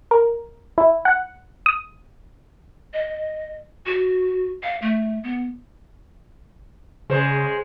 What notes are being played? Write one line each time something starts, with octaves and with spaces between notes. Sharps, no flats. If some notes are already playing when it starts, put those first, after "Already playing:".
A#4
E4
F#5
D#6
D#5
F#4
F5
A3
B3
C#3 G#3 C5